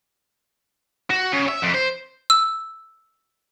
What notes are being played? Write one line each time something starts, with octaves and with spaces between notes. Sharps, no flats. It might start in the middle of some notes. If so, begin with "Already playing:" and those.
F#4
C#3
E5
F2
C5
E6